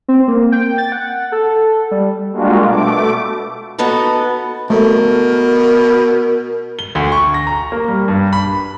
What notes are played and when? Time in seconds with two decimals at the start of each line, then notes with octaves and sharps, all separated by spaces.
0.08 C4
0.28 A#3
0.52 G5
0.78 A6
0.92 F#5
1.32 A4
1.91 G3
2.33 G3 G#3 A#3 D4 F4 F#4
2.64 B2 A3 D6
3.78 B3 D#4 F#4 A4 B4
4.70 B2 A3 A#4
6.79 G7
6.95 D2
7.12 C#6
7.34 A#6
7.47 A#5
7.72 A#3
7.88 G3
8.08 G2
8.33 B5